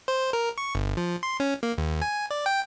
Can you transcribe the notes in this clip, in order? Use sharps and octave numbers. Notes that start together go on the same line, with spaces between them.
C5
A#4
C#6
G1
F3
C6
C#4
A#3
D#2
G#5
D5
G5